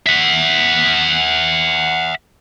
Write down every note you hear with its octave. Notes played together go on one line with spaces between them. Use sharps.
E5 F#5